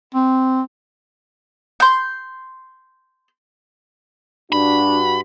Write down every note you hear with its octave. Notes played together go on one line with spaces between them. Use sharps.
C4
C6 G6
G2 D4 F#4 B5